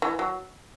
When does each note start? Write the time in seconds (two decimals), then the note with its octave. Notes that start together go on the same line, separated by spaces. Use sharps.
0.02 E3
0.19 F#3